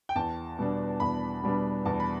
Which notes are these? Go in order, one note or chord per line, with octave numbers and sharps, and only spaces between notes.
G5
E2 A5
B2 G3 B3 D4
E2 B5
B2 G3 B3 D4
E2 A5
B5